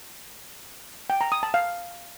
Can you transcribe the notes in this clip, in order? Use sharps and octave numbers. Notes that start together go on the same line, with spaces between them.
G5
A#5
D#6
A5
F5